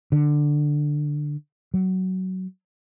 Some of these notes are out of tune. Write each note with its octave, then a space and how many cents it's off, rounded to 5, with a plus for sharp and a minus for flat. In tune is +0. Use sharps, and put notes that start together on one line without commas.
D3 +10
F#3 +15